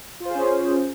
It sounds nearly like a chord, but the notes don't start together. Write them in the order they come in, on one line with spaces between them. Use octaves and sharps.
F4 C5 G#4 C#4